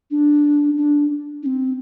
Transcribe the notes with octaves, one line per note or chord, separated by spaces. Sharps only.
D4
D4
D4
C4